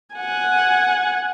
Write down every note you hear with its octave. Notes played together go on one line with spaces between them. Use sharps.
F#5 G#5